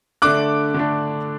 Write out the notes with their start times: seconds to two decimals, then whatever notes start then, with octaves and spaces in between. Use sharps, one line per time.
0.22 D3 A3 D4 D6 F#6
0.74 D3 A3 D4